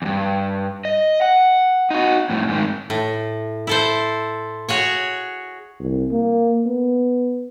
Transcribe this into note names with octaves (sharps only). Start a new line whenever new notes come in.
E2 G2
D#5
F#5
D#4 F#4
F2 A2
G#2 D#3
A2
E4 A4 C5
F#4 G#4 C#5
C2
A#3
B3